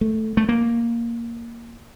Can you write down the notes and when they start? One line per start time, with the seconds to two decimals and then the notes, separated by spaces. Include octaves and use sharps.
0.01 A3
0.37 A3
0.49 A#3